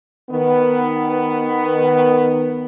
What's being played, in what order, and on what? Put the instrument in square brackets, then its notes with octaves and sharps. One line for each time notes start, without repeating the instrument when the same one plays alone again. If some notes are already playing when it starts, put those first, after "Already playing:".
[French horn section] D#3 B3